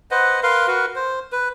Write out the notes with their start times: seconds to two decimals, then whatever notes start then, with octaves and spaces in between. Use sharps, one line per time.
0.11 B4 C5 D#5 F#5
0.43 A#4 B4 F5 C6
0.68 F#4 A#4 B4
0.95 C5
1.32 B4